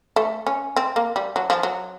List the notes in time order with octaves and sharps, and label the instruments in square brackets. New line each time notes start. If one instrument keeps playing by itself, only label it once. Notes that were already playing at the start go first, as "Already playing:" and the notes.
[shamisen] A3
C#4
C4
A#3
G3
F#3
F3
F#3